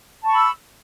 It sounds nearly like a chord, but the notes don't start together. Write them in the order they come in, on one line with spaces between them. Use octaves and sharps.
A5 C#6 B5 E6